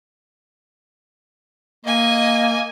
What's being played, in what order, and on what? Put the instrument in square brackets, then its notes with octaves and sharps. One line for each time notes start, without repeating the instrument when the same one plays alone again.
[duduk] A#3 [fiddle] D#5 G#5